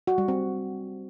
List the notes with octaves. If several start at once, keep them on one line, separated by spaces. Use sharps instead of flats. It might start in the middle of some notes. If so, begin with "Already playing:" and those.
F#4
G3
C4